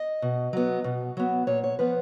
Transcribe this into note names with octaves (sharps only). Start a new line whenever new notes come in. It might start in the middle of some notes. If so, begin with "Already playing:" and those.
Already playing: D#5
B2
F#3 B3
B2
F#3 B3
A#2 C#5
C#5
F3 B3 B4